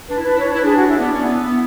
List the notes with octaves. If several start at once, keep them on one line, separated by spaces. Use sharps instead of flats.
D4 B4
E4
D4 B4
E4
D4 C#5
E4 B4
D4 G#4
F#4
E4
B3 D4
C#4
B3 E4
B3